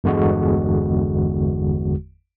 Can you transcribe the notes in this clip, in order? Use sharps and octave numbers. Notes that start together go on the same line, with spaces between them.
G1 E2 D3 G#3 F#4